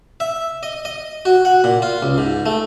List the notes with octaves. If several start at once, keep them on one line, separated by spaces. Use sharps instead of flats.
E5
D#5
D#5
F#4
F#5
A#2
F4
C#2
G#2
A3